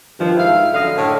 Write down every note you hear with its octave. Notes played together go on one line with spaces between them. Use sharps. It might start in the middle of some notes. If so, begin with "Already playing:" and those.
G2 D#3 F3
G#2 E4 F5
F#2 D3 D#5 F5
A2 D3 D4 A4 C#5